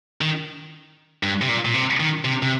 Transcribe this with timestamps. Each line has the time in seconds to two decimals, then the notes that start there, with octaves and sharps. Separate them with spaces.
0.21 D#3
1.23 G2
1.42 C3
1.48 A#2
1.65 A#2
1.74 C3
2.00 D#3
2.25 C3
2.42 C3